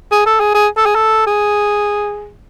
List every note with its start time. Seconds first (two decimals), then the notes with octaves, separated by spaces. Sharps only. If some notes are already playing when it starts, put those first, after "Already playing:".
0.12 G#4
0.26 A4
0.40 G#4
0.55 G#4
0.77 A4
0.86 G#4
0.95 A4
1.27 G#4